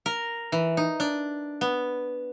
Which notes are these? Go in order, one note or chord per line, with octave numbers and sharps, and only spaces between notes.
A#4
E3
D#4
D4
B3